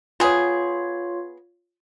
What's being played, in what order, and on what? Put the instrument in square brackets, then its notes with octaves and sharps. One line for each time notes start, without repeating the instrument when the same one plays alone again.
[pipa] B3 G#4 [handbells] F4 C#5